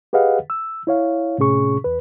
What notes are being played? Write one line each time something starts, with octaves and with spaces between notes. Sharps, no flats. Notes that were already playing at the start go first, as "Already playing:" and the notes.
G4 G#4 B4 D#5 F5 F#5
E6
E4 C#5 F5
A2 C3 C#4 G#4 C#6
E2 B4